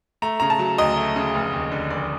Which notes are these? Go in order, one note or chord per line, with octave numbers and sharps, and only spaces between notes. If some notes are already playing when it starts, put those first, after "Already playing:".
A3 A#5
C#3 A#5
A5
F#3
D2 D#5
A3
C#3
F1
D#2
D3
F1 D5